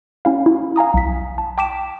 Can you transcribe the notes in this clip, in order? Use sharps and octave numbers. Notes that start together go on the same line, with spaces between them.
C#4 E4 F5
E4
F5 G#5 A#5 D#6
B1 B6
A5
G5 A5 D6 B6 D7 E7